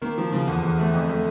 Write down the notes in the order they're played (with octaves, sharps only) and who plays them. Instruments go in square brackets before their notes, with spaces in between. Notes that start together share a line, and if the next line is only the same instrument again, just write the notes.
[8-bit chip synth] D#3 [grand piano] A#3
[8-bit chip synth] D#3 [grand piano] F3
[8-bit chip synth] C#3 [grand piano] F3
[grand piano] E2 [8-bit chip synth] D3
[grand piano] E2
A3
F2
A3